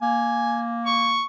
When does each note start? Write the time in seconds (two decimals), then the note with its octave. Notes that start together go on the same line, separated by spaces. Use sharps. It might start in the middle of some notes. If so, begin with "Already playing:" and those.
0.02 A#3 G#5
0.86 C#6